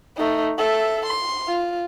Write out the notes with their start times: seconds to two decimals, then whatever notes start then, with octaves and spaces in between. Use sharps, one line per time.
0.17 A3 D#4
0.58 A4 E5
1.06 C6
1.47 F4